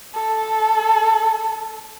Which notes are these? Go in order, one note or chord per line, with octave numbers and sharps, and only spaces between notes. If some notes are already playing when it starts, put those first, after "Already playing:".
A4